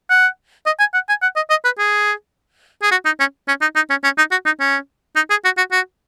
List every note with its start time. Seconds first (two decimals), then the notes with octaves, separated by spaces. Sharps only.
0.10 F#5
0.66 D#5
0.80 G#5
0.94 F#5
1.09 G#5
1.22 F#5
1.36 D#5
1.50 D#5
1.65 B4
1.79 G#4
2.83 G#4
2.91 F#4
3.05 D#4
3.20 C#4
3.48 C#4
3.62 D#4
3.75 D#4
3.90 C#4
4.04 C#4
4.18 D#4
4.31 F#4
4.46 D#4
4.60 C#4
5.16 D#4
5.30 G#4
5.45 F#4
5.58 F#4
5.72 F#4